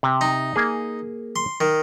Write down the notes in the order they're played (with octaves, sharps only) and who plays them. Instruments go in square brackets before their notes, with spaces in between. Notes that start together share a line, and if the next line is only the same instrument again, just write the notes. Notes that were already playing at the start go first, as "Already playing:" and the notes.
[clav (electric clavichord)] C3
[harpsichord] D#4
[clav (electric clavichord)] A#3 G#4
[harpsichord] C6
D#3